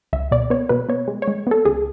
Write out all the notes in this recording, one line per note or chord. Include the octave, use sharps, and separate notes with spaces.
C#2 E5
B2 D5
B3 C#5
B2 B4
B3 C#5
G#3
C#5
G#3
B3 A4
C#2 G#4